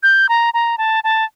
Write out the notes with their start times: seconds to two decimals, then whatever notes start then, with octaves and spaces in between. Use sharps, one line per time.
0.03 G6
0.29 A#5
0.54 A#5
0.78 A5
1.04 A5